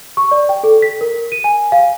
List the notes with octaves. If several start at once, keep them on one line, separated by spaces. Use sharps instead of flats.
C#6
D5
G5
A4
B6
A#4
D#7
G#5
F5